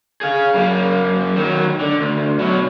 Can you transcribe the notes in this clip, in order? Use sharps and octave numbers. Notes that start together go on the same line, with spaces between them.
G#4 F5
F#2 A#3
D#3 F#3
D3
D2
B1 F#3